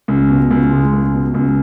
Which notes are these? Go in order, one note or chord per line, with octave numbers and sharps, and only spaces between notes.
C#2
B2
C#2
G#3
C#2
B2
C#2